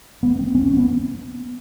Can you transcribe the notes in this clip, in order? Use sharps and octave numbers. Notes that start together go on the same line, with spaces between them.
B3
C4
C#4
C#4
B3